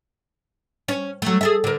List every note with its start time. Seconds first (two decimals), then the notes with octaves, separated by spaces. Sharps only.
0.88 C#4
1.22 F#3 A3
1.41 G#4 A4 E5
1.64 D3 A#4